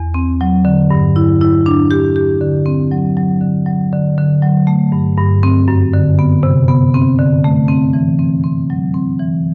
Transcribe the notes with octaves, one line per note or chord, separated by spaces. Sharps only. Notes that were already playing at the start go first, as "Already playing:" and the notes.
Already playing: E2
C4
F#3
D3
G2
E4
E4
D4
G4
G4
D3
C4
F#3
F#3
D3
F#3
D3
D3
F#3
A3
G2
G2
C4
F#2
D3
B3
C3
B3
C4
D3
A3
C4
E3
C4
C4
F#3
C4
E3